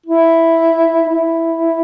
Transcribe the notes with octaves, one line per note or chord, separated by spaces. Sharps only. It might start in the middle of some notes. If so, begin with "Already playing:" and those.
E4
E4